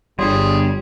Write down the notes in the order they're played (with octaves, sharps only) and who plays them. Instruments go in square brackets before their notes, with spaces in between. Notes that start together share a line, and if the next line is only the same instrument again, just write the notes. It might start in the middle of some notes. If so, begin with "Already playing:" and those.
[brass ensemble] G1 [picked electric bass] G3 [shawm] G#4 [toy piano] C#5 F5 C6